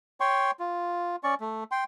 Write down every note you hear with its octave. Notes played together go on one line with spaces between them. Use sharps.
C#5 G5 C6 C#6
F4
C#4 D5 C#6
A3
G5 C6